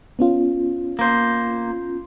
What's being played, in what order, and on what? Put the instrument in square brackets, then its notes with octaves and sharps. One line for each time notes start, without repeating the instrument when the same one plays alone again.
[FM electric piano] B3 C#4 F4
[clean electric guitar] A#3 C5